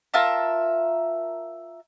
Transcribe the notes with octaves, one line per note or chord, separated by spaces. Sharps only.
F4 A#4 E5 A5